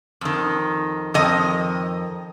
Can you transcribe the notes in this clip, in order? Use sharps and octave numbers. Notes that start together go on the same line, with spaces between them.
F2 D#3
F2 D#3 D#5